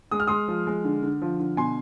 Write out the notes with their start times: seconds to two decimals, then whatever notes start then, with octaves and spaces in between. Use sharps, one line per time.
0.11 G#3 D#6
0.20 F6
0.27 G#3 C6 D#6
0.48 F3
0.67 G#3
0.84 D3
1.03 D3
1.22 F3
1.39 D3
1.57 B2 G#5 C6